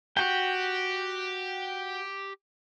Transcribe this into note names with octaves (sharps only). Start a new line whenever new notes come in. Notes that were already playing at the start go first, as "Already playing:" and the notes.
F#4 G4 G5